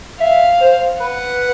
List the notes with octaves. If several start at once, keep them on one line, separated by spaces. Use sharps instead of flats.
E5 F5
C5
B4 F#5